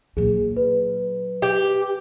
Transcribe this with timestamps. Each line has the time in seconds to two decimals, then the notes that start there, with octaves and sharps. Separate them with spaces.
0.17 A#2 F#3 G#4
0.56 B4
1.42 G4